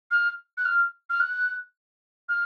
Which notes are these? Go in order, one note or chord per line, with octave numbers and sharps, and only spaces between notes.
F6
F#6
F6
F6
F#6
F6